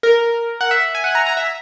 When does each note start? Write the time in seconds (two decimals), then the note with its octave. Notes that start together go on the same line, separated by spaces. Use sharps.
0.03 A#4
0.61 F#5
0.71 E5
0.95 G#5
1.04 F#5
1.15 A#5
1.27 A#5
1.37 E5